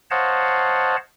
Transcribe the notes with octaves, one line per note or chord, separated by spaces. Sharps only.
C5 C#5 D#5 F5 F#5 A5